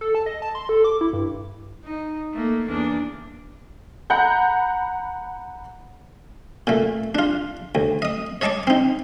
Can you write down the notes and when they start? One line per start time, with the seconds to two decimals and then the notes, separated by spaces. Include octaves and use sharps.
0.01 A4
0.15 A5
0.26 D#5
0.42 A5
0.55 C6
0.69 A4
0.84 D6
1.01 E4
1.13 G2
1.85 D#4
2.33 A3 A#3
2.67 E2 A#3 D4
4.10 F#5 A#5 B5 G6
6.67 A#2 A3
7.15 D4 F4
7.75 D2
8.02 D#5 D#6
8.41 C#5 D#5 A5 C#6 D6
8.67 C4 D#4